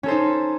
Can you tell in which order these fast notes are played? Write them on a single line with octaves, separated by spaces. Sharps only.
C#4 A4 C5 D#4